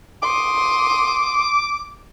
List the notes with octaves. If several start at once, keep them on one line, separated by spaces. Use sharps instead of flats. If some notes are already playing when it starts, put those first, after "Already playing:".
C6 D6 D#6